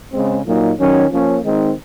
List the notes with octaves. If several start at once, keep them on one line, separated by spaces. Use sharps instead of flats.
C#3 G#3 C4
A#2 F#3 A#3 D#4
D#3 F#3 C#4
F3 A#3 C#4
D#3 G#3 C4 D#4